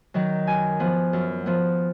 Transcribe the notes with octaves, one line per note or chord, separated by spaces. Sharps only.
D#3 F#3
F#2 G#5
F3 B3
F#2
F3 B3